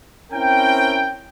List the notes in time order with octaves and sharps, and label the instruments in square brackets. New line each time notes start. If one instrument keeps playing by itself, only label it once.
[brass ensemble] C4 C#4 E4 A#4 G5